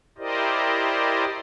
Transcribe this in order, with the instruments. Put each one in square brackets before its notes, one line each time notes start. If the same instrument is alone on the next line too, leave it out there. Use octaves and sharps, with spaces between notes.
[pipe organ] E4 G4 A#4 C5 D5 D#5